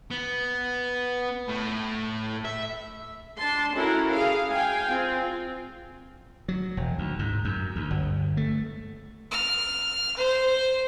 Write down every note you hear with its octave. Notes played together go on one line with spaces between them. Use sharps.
B3
A2
E5
D4 A5 C6
C#4 E4 F#4 A4 A#4
G#4 F5
F5 G5 G#5
C4 F4
F#3
E1
D2
G#2
F#2
D2
G1
A3
F6
C5